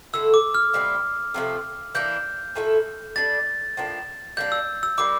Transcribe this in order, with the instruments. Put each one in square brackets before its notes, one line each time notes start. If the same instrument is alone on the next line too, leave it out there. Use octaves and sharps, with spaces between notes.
[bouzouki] D3 A3 E4 A4 [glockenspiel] E6
[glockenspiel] D6
F6
[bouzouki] A#2 G3 C4 E4
C3 F3 A3
[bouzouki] E3 A#3 D4 [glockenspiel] G6
[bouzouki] A#2 A3 E4 A4
[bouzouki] G3 D4 A4 [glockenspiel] A6
[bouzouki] A2 F3 A#3 D4
[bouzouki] G3 A#3 D4 [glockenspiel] G6
[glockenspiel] E6
E6
[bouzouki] G3 A#3 E4 [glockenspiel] D6